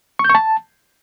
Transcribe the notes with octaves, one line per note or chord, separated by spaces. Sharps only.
C#6
G6
C#6
A5